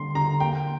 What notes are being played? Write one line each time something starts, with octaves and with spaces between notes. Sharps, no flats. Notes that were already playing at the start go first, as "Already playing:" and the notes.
Already playing: D3 G3 A#3 C6
D3 A#5
A#3 G5